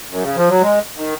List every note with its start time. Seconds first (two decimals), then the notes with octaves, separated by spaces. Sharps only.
0.10 F#2
0.23 C#3
0.35 F3
0.48 F#3
0.61 G#3
0.96 D#3